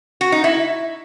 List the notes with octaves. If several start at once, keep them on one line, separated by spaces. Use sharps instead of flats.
F#4
D#4
E4